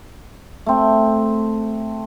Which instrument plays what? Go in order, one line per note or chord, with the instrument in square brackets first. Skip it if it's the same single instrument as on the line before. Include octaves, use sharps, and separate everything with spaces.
[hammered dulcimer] A3 C4